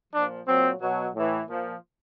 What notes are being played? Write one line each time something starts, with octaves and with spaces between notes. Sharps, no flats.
A#2 F3 D4
A#2 F#3 C4
B2 F#3
A2 E3
A#2 F3